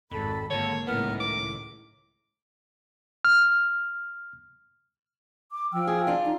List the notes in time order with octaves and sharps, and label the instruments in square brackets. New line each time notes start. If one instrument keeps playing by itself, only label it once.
[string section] G#1 [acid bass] F2 [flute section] A4 B5
[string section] G#1 A#3 [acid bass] D3 [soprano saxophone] C#5 [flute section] A5
[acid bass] D1 [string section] C#2 A2 D#3 [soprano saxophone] B3 [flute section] A#4 F6
[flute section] A#4 [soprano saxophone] D6
[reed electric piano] F6
[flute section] D6
[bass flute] F3 [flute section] G5 E6 F6
[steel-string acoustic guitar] G#4
D4 F4
[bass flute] D#4